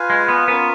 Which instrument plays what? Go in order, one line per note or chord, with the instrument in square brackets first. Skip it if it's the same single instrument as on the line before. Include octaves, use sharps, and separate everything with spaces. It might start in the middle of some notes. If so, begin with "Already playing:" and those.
Already playing: [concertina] F4 B4 F5 G#5
[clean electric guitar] G#3
B3
[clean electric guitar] B3 [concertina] C#4 F4 A#4